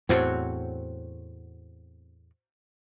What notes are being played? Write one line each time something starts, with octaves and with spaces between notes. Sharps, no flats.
E2 A2 C4 F#4 C#5